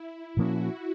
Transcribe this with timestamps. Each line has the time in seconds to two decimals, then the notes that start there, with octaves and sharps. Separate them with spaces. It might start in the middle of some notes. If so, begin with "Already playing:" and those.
Already playing: E4
0.37 A#2 F3 A#3 C#4 F#4